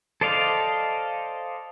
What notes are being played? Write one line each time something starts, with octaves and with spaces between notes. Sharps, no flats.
A4 C5 D5 D#5 F5